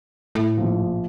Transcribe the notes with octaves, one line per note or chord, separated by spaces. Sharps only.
A2
A#1 F3